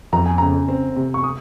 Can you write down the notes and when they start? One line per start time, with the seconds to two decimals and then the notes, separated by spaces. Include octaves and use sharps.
0.12 F2 A#5
0.26 G#5
0.38 C#3 A#5
0.68 C4
0.96 C3
1.14 C#6
1.24 D#6